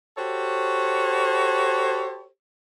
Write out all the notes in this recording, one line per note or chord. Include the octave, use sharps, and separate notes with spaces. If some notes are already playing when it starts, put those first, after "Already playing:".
F#4 G4 A4 C5 C#5